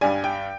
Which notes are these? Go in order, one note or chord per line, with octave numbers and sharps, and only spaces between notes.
G2 G3 G#5
G5